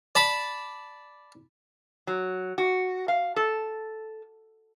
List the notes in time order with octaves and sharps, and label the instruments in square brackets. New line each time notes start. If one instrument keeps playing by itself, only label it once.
[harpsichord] D5 A5 B5 D6
[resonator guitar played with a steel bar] F#3
F#4
F5
A4